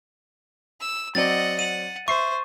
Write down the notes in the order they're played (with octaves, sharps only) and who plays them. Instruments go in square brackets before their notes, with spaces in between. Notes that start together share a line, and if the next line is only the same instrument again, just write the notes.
[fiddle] E6
[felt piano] F#3 C4 D5 [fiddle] D#5 F#5 [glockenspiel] A6
[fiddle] F#5 [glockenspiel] D#7
[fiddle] C5 [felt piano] E5 C7 [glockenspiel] C#6